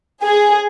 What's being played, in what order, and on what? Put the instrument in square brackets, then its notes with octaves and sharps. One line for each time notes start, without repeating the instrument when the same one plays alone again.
[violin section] G#4